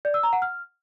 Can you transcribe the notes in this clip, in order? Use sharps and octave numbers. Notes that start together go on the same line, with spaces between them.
D5
E6
A#5
F#5
F6